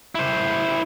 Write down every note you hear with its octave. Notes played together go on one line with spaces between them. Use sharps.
E4 C5